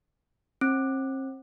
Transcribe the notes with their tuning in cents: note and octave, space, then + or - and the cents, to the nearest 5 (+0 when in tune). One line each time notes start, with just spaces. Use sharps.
C4 +35